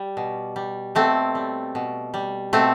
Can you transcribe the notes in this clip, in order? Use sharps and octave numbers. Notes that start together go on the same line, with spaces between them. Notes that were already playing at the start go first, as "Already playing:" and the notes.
Already playing: G3
B2
G3
B2 A3 C4
G3
B2
G3
B2 A3 C4